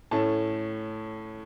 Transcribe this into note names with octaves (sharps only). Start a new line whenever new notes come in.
A2 A3 C#4 A5